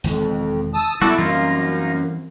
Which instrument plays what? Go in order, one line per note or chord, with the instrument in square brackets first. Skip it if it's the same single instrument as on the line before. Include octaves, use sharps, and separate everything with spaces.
[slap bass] E1 D#3 G#3 [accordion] F2
[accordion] A5 D#6 E6
[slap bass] G3 B3 [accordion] E4 [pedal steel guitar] F#4 A4 D5
[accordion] F#2 [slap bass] E3 G3 C4 [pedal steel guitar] A#3 D#4 F4